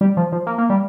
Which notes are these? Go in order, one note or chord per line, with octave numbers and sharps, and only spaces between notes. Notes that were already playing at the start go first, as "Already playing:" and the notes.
G3
F3
F3
A#3
A#3
G3